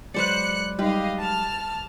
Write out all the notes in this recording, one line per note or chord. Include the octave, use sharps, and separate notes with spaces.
F#3 G#3 B4 C5 D5 F#6 C#7
G3 D#4 G4 B4 D#5 F5
A5 F6